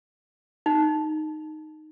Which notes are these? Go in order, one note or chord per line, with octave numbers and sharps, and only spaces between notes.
D#4